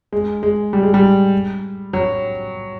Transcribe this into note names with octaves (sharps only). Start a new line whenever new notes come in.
G#3
G#3
G3
G#3
G3
F#3